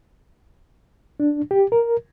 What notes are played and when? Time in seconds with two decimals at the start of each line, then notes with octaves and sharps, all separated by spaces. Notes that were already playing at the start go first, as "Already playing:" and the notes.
1.20 D4
1.51 G4
1.72 A#4